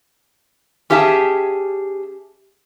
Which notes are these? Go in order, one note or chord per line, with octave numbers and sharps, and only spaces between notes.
C#4 G4 G#4 E5 G5 A5